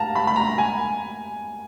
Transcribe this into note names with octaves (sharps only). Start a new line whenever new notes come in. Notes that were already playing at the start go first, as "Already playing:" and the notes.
Already playing: F5 A5 A#5
B5
B5
A#5
G#5